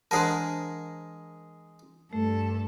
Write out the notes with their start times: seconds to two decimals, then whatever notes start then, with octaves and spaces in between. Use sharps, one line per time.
0.11 E3 G#3 D4 G#4 A#4 C5 F#5 A5
2.13 G2 A3 A4